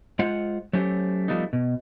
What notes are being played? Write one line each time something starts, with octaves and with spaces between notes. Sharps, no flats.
G#3 F4 C5 F#5
F#3 A3 C#4 G4 C5
F3 G3 A3 B3 D#4
B2